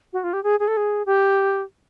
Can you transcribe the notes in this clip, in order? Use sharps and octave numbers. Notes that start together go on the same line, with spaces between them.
F#4
F4
G4
G#4
G#4
A4
G#4
G4